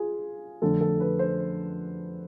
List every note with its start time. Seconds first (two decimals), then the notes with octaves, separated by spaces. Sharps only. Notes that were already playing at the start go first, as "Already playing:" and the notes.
Already playing: F4 G#4
0.62 F2 D3 A3 A4
0.81 A4
1.00 B4
1.19 C5